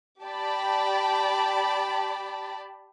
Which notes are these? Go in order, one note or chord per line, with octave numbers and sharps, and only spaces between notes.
G4 D5 G5 A5 B5